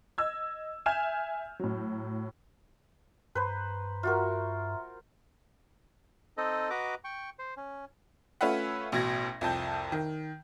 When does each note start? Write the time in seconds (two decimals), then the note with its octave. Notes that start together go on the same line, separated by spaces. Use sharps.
0.18 D#5 E6 G#6
0.86 E5 G#5 F6 G6 G#6 E7
1.60 A2 F#3
3.35 G2 B4 C5 A#5
4.03 F4 F#4 A#4 E5 A#5
6.37 C4 D#4 A4 D#5
6.70 F#4 B4 D#5 A#5 D6
7.04 G5 C#6
7.39 C5
7.57 C#4
8.41 A3 C#4 F4 B4 E5 F#5
8.92 A1 B2 G#6 A#6
9.41 C2 F2 A5 G6
9.92 D#3